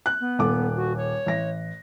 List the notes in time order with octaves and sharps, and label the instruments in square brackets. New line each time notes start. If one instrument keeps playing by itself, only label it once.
[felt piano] F#6
[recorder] B3
[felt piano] D#1 A4 D6
[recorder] F#4
C#5
[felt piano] A1 A#6